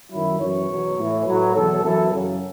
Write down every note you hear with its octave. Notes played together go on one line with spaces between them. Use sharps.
F#2 D#3 F#3 E4
F#2 E3 C#5
E2 B2 F#3
A2 E3
A2 F#3 B4
E2 B2 F#3 A4
F#2 E3 A4
F#2 C#3 F#3